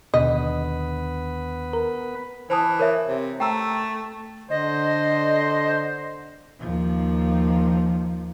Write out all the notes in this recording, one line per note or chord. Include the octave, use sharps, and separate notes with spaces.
D#2 B2 D3 B3 B4 D#5
A#4
E3 C5 A5 D#6
A#4 C#5 E5
C3
A3 G5 A#5 E6
D3 C5 D#5
D#2 F3